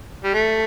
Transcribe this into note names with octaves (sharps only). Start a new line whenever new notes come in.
G3
A3